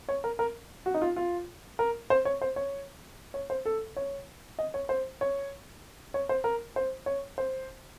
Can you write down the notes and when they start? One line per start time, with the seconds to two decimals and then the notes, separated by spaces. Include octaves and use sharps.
0.09 C#5
0.24 A#4
0.39 A#4
0.86 F#4
0.94 D#4
1.02 F4
1.16 F4
1.79 A#4
2.10 C5
2.25 C#5
2.42 C5
2.56 C#5
3.34 C#5
3.50 C5
3.65 A4
3.96 C#5
4.59 D#5
4.74 C#5
4.89 C5
5.21 C#5
6.14 C#5
6.29 C5
6.44 A#4
6.76 C5
7.06 C#5
7.38 C5